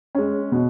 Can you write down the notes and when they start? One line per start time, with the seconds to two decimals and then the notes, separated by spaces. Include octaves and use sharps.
0.15 G#3 C#4
0.52 B2